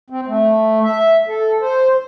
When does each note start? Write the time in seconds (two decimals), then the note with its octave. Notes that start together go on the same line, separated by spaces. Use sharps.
0.10 C4
0.27 A3
0.83 E5
1.28 A4
1.61 C5